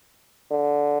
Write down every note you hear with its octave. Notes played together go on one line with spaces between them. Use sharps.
D3